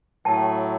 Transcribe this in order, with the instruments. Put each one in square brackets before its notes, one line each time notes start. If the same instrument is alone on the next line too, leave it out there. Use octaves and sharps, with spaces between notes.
[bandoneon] A2 F#3 A3 [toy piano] G5 A5